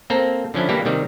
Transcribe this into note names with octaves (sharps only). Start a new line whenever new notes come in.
A#3 C4 A4 C5 A#5
D3 F3 C#4 D4 E4
E3 G3 A#3 E4 G4
C3 D#3 G3